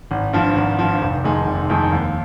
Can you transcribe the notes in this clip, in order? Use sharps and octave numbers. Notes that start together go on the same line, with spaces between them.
G#1
G2 F3
G#1
G2 F3
F1
F2 D#3 G#3
F1
F2 D#3 G#3
D#2